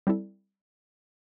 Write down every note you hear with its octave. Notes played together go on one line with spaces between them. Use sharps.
G3 C4 E4 A4